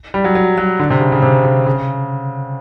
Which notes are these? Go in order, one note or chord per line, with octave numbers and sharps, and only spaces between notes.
G3
F#3
F#3
F#3
D3
C3
C#3
C#3
C3
C#3
C#3